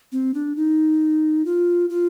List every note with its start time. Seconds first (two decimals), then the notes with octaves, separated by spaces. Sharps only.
0.12 C4
0.34 D4
0.56 D#4
1.45 F4
1.90 F4